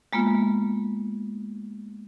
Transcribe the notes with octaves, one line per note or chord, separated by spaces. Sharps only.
G#3 A#3 B3 F4